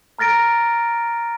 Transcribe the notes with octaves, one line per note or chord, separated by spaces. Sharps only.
A#5 F6 A6 A#6 D7